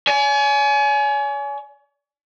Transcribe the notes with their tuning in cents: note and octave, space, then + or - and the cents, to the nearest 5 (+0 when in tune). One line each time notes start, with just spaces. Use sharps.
C#5 +45 G#5 +20